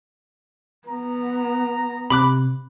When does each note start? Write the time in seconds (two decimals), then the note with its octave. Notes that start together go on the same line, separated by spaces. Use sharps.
0.88 B3 A#5
2.10 C3 B5 D6 F#6